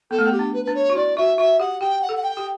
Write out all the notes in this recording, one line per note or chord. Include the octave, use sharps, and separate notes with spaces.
B3 A4
A3
B3
G4
D4
B4
D4 B4
C#5
F#4
E4 D5
F#4 E5
F#4 E5
G4 F#5
G4 G5
F#5
A4
F#5
G5
G4